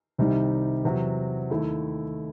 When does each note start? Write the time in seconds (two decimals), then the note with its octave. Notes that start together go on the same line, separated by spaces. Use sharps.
0.18 C2 C3 D#3 G3 D#4
0.84 E2 C3 F#3
1.50 D#2 D#3 A3 E4